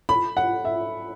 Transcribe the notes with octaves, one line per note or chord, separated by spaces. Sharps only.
B5
F#5
E5